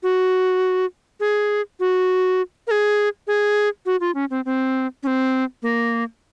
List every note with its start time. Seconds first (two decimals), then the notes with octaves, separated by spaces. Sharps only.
0.03 F#4
1.20 G#4
1.80 F#4
2.67 A#4
2.71 G#4
3.27 G#4
3.86 F#4
4.01 F4
4.15 C#4
4.30 C4
4.45 C4
5.03 C#4
5.07 C4
5.63 A#3